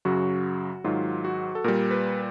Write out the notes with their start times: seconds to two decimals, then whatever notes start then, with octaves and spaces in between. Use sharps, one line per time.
0.05 F#2 C#3 F#3 F#4
0.84 G#2 D#3 F#3 F4
1.24 F#4
1.55 A4
1.64 A#2 G3 A#4
1.91 B4